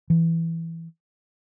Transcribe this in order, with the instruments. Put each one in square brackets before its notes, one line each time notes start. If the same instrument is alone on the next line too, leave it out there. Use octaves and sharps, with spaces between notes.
[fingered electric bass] E3